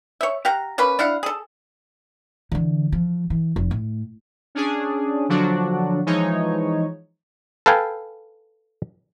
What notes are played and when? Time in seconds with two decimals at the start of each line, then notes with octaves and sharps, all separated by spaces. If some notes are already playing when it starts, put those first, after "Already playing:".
0.21 C#5 E5
0.45 G4 F5 F#5 A#5
0.78 A#3 C#4 B4
0.99 D4 E4 F5 F#5
1.23 G#4 A4
2.52 D3 E3
2.92 F3
3.30 E3
3.56 F1
3.71 A2
4.55 C#4 D4 G#4
5.29 D3 F3 F#3 D4 F#4
6.06 E3 F3 G#3 D#4 C#5
7.66 A4 B4 F5 G5 G#5